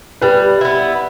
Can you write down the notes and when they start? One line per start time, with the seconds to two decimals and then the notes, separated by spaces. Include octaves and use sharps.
0.21 G3 B4
0.61 B3 E4